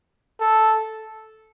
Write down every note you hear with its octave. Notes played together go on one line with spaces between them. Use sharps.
A4